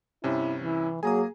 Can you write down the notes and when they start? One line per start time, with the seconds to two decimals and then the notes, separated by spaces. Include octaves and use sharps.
0.24 G2 C3 C#4 E4
0.62 E3 E4
1.03 F#3 A#3 G#4 G#5 A#5 D#6